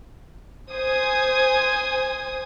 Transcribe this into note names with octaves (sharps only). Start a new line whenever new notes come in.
C5 G#5 D#6